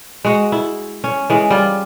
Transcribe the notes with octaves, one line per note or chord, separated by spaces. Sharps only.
G#3 F#4
E4
C#4
E3 G#3
G3 F4